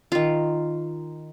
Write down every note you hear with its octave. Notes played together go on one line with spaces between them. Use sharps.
D#3 F4